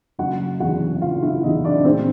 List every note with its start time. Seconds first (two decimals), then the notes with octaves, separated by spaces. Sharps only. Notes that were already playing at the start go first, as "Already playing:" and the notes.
0.19 F#1 F#4 F#5
0.60 E2 C3 E3 F#4 F#5
1.02 F#1 F4 F5
1.22 E4 E5
1.43 E2 C3 E3 D#4 D#5
1.65 D4 D5
1.85 A#1 C4 C5